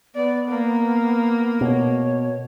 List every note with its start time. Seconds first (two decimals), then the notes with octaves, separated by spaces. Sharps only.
0.15 B3 D5
0.49 A#3
1.61 B2 C#5